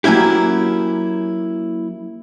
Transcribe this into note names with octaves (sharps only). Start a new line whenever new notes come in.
F#3 A#3 C#4 E4 G4